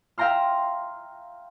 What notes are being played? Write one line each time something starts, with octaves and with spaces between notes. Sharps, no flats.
E5 F5 G5 A#5 C6 F6